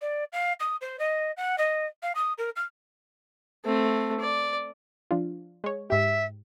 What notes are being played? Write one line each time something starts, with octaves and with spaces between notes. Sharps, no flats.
D5
F5
D#6
C5
D#5
F#5
D#5
F5
D#6
A#4
F6
A3 C4
D5
F3 D4 F4
G#3 C#5
G#2 G4 E5